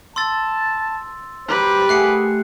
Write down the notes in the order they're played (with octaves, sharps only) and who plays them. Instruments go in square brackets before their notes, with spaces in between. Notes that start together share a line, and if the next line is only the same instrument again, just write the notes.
[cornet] A5 [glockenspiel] C6 E6 A6
[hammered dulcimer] G3 A#5 [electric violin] B4 D6 [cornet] C5
[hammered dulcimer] A3 F#5 G#5 [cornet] G#4 [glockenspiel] F#6 C7 C#7